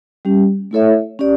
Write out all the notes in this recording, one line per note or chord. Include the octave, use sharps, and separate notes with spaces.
G3 C#4 G4
A3 E4 A4 C#5 E5
C#4 G4 D5